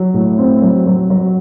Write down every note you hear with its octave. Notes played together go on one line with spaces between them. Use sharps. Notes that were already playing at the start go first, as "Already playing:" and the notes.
Already playing: F#3
A2
C4
F#3
F#3
F#3